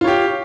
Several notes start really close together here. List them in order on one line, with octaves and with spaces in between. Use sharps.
F4 C#5 G4